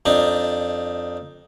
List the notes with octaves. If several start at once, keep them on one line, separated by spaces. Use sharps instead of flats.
F2 D4 D#4